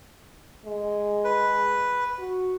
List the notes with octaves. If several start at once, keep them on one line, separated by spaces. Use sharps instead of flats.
G#3
B4
F#4